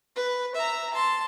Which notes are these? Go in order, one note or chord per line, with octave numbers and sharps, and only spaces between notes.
B4
E5 A#5
A5 C6